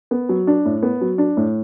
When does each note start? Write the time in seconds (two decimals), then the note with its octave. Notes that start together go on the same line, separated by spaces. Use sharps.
0.11 B3
0.29 F#3
0.47 D4
0.65 A2
0.83 B3
1.01 F#3
1.18 D4
1.37 A2